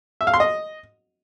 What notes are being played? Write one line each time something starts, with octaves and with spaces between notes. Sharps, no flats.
E5
F5
C6
D#5